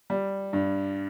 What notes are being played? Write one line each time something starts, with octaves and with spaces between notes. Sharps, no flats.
G3
G2